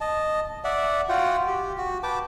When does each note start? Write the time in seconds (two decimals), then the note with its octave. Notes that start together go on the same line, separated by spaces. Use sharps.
0.01 D#5 A5
0.64 D5 E5 F#5
1.09 F4 F#4 F#5 G5
1.47 G4
1.78 F#4
2.03 B4 G5 A5 D6